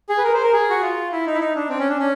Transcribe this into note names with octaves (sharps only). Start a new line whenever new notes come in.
G#4
B4
A#4
C5
A#4
G#4
F#4
F4
E4
D#4
E4
D#4
D4
C4
C#4
D4
C#4